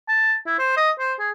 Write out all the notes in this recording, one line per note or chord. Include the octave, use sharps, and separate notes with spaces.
A5
E4
C5
D#5
C5
G#4